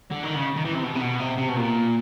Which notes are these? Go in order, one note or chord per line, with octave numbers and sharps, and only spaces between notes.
D3
D#3
C#3
D#3
E3
C3
B2
C3
B2
C3
C3
B2
A#2